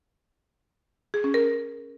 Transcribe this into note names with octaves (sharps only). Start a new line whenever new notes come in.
G#4
C#4
A#4